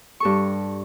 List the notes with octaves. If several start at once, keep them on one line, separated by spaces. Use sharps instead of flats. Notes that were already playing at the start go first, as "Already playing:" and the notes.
G2 A4 C#6